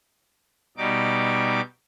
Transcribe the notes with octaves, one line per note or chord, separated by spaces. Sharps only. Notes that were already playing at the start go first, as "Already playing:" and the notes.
B2 G3 D#4 D6